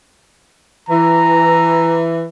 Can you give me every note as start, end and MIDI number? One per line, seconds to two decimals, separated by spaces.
0.89 2.27 52
0.89 2.01 82